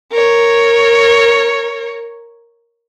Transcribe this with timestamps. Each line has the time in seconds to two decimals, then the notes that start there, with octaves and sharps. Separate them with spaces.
0.12 A#4 C#5